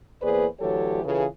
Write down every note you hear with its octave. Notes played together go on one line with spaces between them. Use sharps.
E2 A#3 G#4 B4 C5 D5
D2 E3 F#3 G4 A4 C#5
C#3 E3 F4 G#4 A4 B4